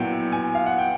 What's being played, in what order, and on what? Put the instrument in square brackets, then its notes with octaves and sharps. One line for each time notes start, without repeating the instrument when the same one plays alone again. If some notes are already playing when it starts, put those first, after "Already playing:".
Already playing: [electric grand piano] A#2 F#3 B3 E4 [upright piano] F#5 G5
[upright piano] G#5
F5
F#5
G5